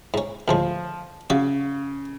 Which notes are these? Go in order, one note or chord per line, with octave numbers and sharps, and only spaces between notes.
G#2 C#4
D2 A2 F3 G#3
C#3 F#4 D5 E5